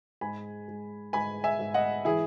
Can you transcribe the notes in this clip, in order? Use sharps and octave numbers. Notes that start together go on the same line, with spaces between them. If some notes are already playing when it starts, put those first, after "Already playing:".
G#2 G#5 B5
G#2
G#2 G#5 B5
E5 G#5
G#2
D#5 F#5
E3 E4 G#4